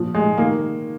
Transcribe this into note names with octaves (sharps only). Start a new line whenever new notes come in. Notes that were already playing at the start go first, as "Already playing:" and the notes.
Already playing: A#2 F3
G#3
D#3 A#3